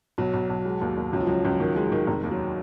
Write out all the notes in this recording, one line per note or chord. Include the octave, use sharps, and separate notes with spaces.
B1 F#3
B1
B1
G#3
D#2
D#2
C#2 F#3
F3
C#2 F#3
C#2
D#3
G#3
D#3
F1
D#2
F#3